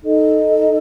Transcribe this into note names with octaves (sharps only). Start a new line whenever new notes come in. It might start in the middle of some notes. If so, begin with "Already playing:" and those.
D#4 A4 D#5